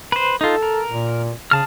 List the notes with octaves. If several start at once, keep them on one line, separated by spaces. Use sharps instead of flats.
B4 C5
D#4 F4 A4
A#4
A#2
C#3 G#4 A5 F6